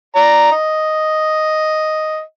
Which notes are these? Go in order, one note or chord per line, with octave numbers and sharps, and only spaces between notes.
D5 A#5
D#5